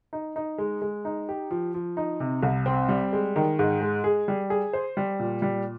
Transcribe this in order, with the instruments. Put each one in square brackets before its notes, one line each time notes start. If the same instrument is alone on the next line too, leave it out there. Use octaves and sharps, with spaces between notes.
[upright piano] D#4
D#4
G#3
G#3
D#4
G4
F3
F3
D#4
C3
C2
C4
G3
G#3
D#3
G#2
G#3
G#4
G3
G#4
C5
G3
A#2
G3